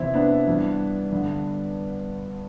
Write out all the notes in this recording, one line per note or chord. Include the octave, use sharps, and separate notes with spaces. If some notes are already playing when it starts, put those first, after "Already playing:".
Already playing: E2 C3 E3 C4 E4
B3 D4
G2 E3
G2 D3